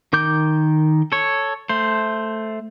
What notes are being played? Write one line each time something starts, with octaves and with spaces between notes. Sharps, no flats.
D#3 A#4 D6 G6
A4 C#5
A3 C5